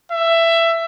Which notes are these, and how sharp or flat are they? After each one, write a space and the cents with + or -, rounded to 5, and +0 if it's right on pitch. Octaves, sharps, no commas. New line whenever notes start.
E5 +15